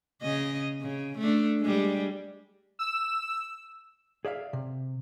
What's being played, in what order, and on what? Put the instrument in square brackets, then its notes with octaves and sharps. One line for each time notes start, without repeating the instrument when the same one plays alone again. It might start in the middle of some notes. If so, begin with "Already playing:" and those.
[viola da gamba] C#3 C#4 D#5
C#3
A3 D4
G3 G#3
[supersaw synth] E6
[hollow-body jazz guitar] G#4 D5 E5 F5
C3